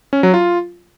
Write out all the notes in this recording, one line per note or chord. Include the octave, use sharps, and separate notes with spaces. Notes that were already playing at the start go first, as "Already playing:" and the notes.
C#4
F#3
F4